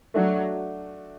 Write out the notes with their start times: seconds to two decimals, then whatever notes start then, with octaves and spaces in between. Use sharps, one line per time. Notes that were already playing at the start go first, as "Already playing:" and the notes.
0.14 F#3 A3 D4 F#4